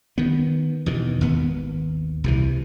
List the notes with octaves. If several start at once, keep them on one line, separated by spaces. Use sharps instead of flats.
D#3 B3
E2 B2 D#3
G#1 D#2 B3
C2 C3 E3